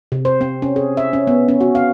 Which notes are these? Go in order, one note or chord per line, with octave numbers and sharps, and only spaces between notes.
C3
C5
C4
C#4
G#4
E5
C#4
B3
C#4
F#4
F5